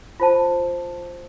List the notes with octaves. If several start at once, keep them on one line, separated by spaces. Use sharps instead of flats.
F4 C5 A5